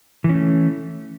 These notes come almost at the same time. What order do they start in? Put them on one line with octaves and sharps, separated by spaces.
E3 C#4 A3